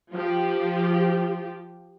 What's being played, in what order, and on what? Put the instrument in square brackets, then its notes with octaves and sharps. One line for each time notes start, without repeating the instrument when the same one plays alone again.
[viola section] F3 G4